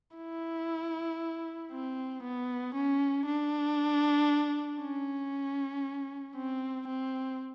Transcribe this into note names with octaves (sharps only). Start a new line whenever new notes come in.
E4
C4
B3
C#4
D4
C#4
C4
C4